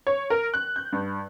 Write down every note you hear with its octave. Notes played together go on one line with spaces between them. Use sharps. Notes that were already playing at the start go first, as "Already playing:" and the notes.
C#5
A#4
F#6
G6
G2